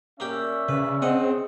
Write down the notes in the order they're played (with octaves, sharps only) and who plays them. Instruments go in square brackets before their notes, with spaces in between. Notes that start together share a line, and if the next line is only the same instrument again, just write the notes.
[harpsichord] A#3 G4 G5 [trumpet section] C#4 D5 E5
[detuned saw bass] C#3 [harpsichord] B4
[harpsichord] C#3 D#5 F#5 [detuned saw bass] C4